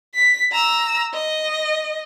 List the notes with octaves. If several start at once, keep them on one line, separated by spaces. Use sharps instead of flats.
B6
A#5 E6
D#5